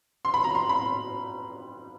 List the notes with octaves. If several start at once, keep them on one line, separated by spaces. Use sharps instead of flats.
C6
B5
A#5
C6
B5